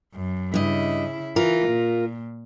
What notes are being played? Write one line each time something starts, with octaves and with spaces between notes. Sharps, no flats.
F#2
G2 C#3 E4 D#5
E3 F4 A#4
A#2